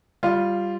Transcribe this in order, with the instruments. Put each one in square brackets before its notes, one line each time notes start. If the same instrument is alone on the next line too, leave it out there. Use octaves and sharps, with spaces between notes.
[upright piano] G3 F4